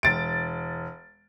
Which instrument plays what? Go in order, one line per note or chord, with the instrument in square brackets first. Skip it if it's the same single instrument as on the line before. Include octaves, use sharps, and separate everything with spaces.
[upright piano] E1 A6 D7